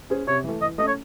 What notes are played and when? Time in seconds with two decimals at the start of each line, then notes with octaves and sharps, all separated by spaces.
0.10 C#4 G#4 C5
0.27 C3 C#5
0.44 E3 A3
0.61 E3 D#5
0.78 A3 D#5
0.82 C#4
0.87 C#5